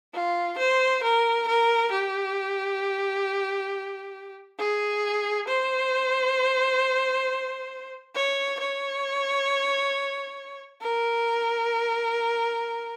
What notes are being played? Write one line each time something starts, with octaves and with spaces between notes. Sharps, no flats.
F4
C5
A#4
A#4
G4
G#4
C5
C#5
C#5
A#4